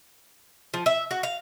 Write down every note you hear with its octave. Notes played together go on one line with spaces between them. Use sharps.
F3
E5
F#4
F5